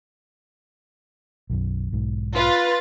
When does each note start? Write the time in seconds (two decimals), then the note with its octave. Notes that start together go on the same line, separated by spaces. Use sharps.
1.50 B1 F#2
1.92 B1 G#2
2.34 F4 B4 A6